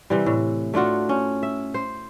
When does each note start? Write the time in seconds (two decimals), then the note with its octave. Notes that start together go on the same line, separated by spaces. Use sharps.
0.10 C3 E3 G3
0.26 A2
0.74 A3 D4 F4 F#4
1.09 C#4
1.43 E5
1.74 C5